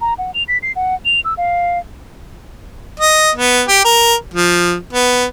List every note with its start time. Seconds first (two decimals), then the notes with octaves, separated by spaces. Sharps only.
0.01 A#5
0.18 F#5
0.34 F7
0.48 B6
0.63 C7
0.76 F#5
1.05 F7
1.25 E6
1.37 F5
3.00 D#5
3.36 B3
3.68 G4
3.85 A#4
4.34 F3
4.93 B3